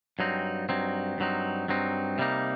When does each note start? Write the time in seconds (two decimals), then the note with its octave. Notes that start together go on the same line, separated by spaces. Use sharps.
0.19 G2 F#3 C4 D#4
0.69 G2 F#3 C4 D#4
1.18 G2 F#3 C4 D#4
1.68 G2 F#3 C4 D#4
2.18 C3 G3 A#3 D#4